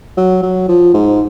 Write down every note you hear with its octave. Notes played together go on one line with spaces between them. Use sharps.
F#3
F#3
F3
G#2